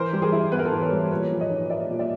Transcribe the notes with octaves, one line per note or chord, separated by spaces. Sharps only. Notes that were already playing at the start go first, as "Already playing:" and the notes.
Already playing: E3 A#4 C5
G3
G#4 A#4
E4
B3 B4
A#4
A4 B4
E3
B4 C#5
G3
A#2 B4 C#5
F3
C#5 D#5
D#4
A#3 D5 E5
A#2
D5 E5